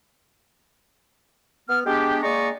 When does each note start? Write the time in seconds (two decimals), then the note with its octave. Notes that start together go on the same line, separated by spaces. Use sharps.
1.69 B3 F6
1.86 G#3 B3 D4 G4
2.23 G#3 A#3 D5 D#5 A#5 C#6